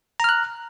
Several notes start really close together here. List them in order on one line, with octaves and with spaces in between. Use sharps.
A#5 F6 F#6